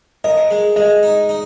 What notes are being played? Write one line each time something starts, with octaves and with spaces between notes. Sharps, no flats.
A#4 D#5
G#3
G#3 D#5
D#4
D#4